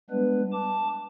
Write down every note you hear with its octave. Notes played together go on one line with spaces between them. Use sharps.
G3 G#3 B3 D4 B4
A5 D6